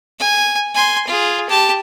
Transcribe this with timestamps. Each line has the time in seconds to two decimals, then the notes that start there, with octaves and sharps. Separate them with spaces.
0.19 G#5
0.75 G#5 C6
1.07 F4 G#4
1.49 G4 A5